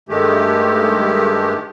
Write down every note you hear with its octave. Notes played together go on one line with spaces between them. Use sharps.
G2 D#3 G#3 A3 G4